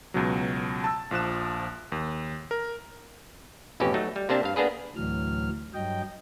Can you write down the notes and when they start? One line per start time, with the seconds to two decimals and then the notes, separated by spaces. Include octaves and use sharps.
0.14 C#2 B2 F#3
0.84 A5 E6
1.11 A#1 F3 F#6 E7
1.92 D#2
2.51 A#4
3.80 A1 F2 B2 C#4 G4
3.94 F#3 A3 D#4
4.16 G3
4.29 C3 A#3 C4 D4 A5
4.43 G2 F5
4.56 A#3 B3 D4 G#4 B4
4.96 D2 A2 E3 F#3 F6
5.74 G2 F#3 D#5 G5